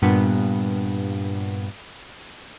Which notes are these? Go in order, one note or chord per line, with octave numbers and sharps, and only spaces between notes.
G2 A#2 B3